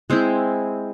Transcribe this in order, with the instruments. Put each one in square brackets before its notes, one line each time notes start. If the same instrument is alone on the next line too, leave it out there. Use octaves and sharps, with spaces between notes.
[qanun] G#3 C4 E4